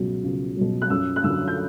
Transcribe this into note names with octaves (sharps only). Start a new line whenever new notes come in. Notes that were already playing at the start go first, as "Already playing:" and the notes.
Already playing: C#2 B2 F#3
C#2
B2 F#3
F#6
F#2 E6
F#6
D3 F#3 E6
G6